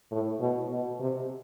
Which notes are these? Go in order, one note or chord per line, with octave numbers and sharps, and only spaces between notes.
A2
B2
B2
C3